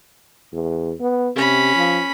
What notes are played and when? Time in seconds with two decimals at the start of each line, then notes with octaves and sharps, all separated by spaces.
0.53 E2
1.00 B3
1.36 C3 C#4 B5
1.76 F3